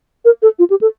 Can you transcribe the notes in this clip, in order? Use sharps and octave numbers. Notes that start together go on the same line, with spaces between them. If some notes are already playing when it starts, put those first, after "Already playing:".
A#4
A4
F4
G4
A4